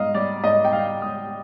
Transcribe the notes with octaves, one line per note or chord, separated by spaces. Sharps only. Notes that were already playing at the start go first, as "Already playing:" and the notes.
Already playing: G#2 G3 D#5 F5
G3 D5
G#2 D#5
G5
G3 F5
G#2 D#6